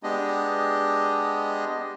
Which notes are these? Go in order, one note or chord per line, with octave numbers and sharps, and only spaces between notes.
G#3 B3 D4 G4 D#5